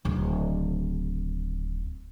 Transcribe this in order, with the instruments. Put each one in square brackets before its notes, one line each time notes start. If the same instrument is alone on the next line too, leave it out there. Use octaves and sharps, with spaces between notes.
[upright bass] D1 C#3